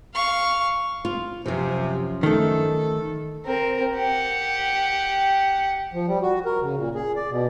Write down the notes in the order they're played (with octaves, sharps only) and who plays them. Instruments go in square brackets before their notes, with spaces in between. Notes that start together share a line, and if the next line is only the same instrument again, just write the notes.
[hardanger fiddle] F5 C#6
[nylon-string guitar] F4
[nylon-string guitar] F#2 F3 [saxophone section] C3
[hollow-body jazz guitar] D#3 A3 [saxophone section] A4
[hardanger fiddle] C4 A#4
G4 F#5
[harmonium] F3
G3
F#4
A#4
C#3
A#2
G#4
D5
B2